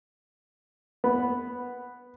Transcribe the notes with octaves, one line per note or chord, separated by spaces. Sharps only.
B3